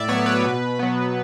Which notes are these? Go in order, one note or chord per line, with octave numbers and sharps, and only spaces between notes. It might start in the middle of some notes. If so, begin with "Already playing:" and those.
Already playing: A2 D5 E5
F#3 B3 C#5
B4
B2
F#3 B3